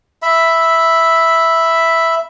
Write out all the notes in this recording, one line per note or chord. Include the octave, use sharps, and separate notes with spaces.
E5 B5